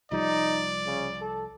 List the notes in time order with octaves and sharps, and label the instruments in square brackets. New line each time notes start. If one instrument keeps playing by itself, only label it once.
[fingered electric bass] C2 F3 G3 [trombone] D#4 [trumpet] D5
[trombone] C#3
A4